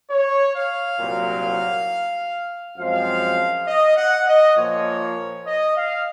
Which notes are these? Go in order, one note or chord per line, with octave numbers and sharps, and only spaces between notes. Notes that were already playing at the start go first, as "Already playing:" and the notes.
C#5
F5
C2 A#2 F#3
F#2 F3 G#3 C4 F5
D#5
F#5
D#5
A#2 F3 A#3 C#5
D#5
F5